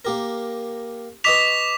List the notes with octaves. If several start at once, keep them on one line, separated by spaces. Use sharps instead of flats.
A#3 G4 A#4
B4 D#5 C#6 D6 B6 F7